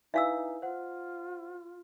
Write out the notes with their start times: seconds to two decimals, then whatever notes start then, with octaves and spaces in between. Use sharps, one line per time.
0.14 D#4 E4 B4 E5 F5 G#5 E6
0.62 F4 C5 F#5